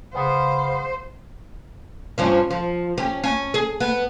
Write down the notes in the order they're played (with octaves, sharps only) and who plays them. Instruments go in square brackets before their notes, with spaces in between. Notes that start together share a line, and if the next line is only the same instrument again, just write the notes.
[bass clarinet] C#3 [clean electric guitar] B3 [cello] C5 [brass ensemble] F5
[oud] G2 F3 C#4
F3
C#4 G4
C#4
G#4
B3